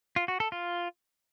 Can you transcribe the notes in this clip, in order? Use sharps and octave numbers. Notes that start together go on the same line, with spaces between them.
F4
F#4
A4
F4